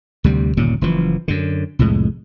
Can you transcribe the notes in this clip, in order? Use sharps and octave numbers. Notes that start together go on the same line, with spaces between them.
D2 C3 G3
G1 D#2 A#2 C#3
F#1 E3 F3
F#2 D3
C2 F2 A2 G#3